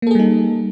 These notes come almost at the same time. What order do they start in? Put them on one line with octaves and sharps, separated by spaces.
A#3 A4 G#4 G3 D#4